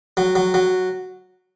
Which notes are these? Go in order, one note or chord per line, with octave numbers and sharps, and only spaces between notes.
F#3
F#3
F#3